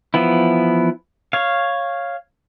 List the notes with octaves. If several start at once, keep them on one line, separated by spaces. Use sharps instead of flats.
E3 F3 B3 E4
C#5 F5